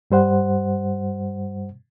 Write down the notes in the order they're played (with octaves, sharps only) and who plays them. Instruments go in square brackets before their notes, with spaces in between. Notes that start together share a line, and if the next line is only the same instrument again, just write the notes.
[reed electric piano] G2 G3 C5 F#5